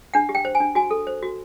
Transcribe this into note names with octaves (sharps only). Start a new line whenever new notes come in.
D4 F#5
G4
G5
C5
G#5
D4
F#4 G#5
A4
C5
F#4